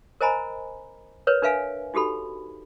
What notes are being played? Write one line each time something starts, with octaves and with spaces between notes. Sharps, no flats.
A#4 C5 D#5 G#5 A#5 B5
A#4 B4 C#5
D4 A#4 B4 E5 F5 G#5
D#4 F#4 G4 A4 B5